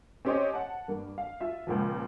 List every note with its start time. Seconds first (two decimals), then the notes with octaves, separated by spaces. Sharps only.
0.25 C4 C#4 G4 C5 C#5 D#5
0.54 F#5 A5
0.88 G2 A#3
1.18 F5
1.41 F4 E5
1.67 C#2 A#2 F3